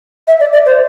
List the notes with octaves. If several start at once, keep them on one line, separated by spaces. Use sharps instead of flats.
E5
D5
D5
C5